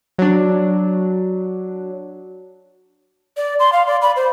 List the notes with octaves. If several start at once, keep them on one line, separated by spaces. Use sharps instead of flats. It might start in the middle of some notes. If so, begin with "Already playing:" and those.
F#3 D4
D5
C6
F5
D5
B5
C5